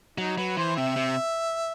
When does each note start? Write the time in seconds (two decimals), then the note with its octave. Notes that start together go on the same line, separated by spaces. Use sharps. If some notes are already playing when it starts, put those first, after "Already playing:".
0.18 F#3 D#4
0.37 F#3 B4
0.57 E3 C5
0.77 C3 E5
0.96 C3